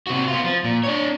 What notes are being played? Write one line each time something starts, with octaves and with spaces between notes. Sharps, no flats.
C3 F#4
B3 F4
F3
A#2
D4 C#5